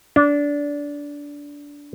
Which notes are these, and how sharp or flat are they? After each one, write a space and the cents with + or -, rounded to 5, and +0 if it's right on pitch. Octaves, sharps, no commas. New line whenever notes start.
D4 -20